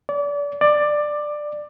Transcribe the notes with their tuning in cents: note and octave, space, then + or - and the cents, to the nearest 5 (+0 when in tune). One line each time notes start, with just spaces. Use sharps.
D5 -30
D5 +15